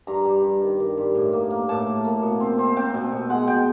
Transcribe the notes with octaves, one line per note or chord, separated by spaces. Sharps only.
G2 A#5
G3
G2
D#3
G2
G2
A2
A#3
A#3
A2 A5
A2
A#3
B2
C4
C4
C4 G5
B2
B2
G#3 F#5
B2 G5